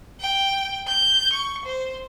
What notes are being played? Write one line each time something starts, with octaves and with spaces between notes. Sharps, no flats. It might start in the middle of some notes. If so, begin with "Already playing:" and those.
G5
G6
C#6
C5